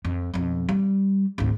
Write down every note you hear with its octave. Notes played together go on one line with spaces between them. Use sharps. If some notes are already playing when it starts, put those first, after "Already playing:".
F2
B1 F2
G3
G#1 D2